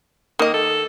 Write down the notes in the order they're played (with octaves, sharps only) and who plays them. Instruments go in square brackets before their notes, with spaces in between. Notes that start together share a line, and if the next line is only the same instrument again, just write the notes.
[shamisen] D#3 D#5 [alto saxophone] A#3
[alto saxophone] A4